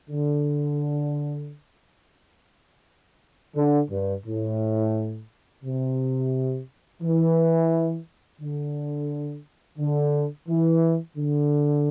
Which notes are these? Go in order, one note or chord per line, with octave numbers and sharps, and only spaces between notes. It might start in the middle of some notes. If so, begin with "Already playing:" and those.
D3
D3
G2
A2
C3
E3
D3
D3
E3
D3